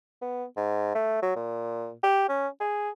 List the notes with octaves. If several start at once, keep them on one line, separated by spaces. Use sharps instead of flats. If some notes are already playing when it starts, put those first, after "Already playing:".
B3
G#2
A3
F#3
A#2
G4
C#4
G#4